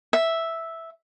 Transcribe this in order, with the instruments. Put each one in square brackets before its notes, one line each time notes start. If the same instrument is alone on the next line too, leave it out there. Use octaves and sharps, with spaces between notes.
[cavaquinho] E5